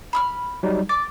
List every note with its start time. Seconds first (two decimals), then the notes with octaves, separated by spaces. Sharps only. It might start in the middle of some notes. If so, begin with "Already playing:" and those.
0.13 B5 E6 F6
0.63 F#3 G3 D#4
0.89 D6 A6